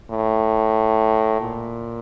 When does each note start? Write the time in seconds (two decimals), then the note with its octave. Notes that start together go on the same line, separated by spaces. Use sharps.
0.11 A2
1.40 A#2